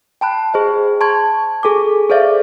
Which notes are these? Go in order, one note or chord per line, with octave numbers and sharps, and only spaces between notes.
G5 A5 B5 F#6
G#4 C5 D#5
A5 C6 C#6 G#6
G#4 A4 G#5 D6
G#4 A4 C5 D5 E5 F5